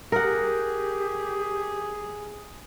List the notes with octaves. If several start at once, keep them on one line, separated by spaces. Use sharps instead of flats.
G4 G#4 A#4 F#5